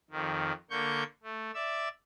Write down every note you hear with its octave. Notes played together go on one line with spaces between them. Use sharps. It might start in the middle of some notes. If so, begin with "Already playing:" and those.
F2 D#3
D3 A#3 C#6 G6
A3
D5 E5 E6